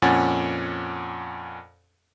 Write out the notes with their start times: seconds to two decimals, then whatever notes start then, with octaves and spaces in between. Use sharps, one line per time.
0.02 F2 A#2 C#4 F#5 G#5 A6